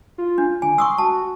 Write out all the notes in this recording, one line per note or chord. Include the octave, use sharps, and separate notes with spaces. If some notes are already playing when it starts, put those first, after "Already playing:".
F4
D4
D3 G#5
C6 C#6 D#6 E6
F#4 A5